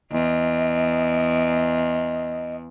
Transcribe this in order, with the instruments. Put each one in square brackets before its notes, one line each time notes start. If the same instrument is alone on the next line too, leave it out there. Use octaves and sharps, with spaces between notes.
[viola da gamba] E2 [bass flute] D#5